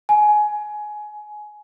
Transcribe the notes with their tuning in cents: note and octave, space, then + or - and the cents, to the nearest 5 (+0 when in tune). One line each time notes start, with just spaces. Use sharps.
G#5 +20